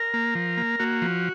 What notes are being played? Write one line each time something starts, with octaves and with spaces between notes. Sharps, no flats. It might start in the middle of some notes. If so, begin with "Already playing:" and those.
Already playing: A#4
A#3
F3
A#3
A#3 F#4
F3